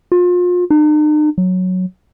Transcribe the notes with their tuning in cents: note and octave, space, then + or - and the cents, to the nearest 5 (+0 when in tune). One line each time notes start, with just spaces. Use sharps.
F4 +35
D#4 -45
F#3 -5